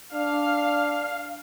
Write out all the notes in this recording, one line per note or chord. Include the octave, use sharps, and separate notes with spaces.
D4 F5